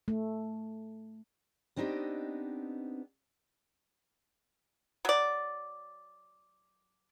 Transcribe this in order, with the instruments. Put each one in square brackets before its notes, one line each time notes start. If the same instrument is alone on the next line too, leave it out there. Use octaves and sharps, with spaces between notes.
[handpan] A3
[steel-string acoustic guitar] B3 C4 D4 D#4 G4 D#5
[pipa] F#3 D5